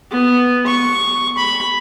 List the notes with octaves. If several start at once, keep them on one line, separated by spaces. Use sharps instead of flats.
B3
C#6
B5